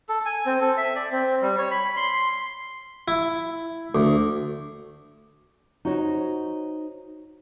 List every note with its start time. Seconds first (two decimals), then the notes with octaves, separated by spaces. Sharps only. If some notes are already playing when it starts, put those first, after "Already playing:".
0.09 A4
0.25 G#5
0.46 C4
0.61 A4
0.77 E5
0.96 D5
1.12 C4
1.42 G3
1.58 C#5
1.71 B5
1.97 C6
3.08 E4
3.95 D2
5.85 D#4 F#4 C5 C#5